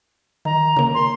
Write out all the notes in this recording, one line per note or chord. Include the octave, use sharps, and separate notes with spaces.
D#3 A#5
C#3 A#3
C6